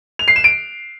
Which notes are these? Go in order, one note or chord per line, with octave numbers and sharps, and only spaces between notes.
F7
C7
E7
D7